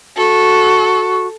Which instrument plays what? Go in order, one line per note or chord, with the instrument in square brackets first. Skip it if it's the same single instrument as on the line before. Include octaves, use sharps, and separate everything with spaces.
[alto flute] F#4 [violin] A4